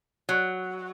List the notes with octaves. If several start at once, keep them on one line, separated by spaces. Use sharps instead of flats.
F#3